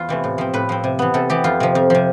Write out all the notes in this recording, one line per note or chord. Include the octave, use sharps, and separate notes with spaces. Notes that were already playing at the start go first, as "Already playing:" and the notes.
Already playing: E2 F4
C3 E3 A3
A2
F3 C4
A2 B4
F3 C4
C3
E3 B3
C3 A4
E3 B3 G4
F2 F4
C3 F3
F2
C3 F3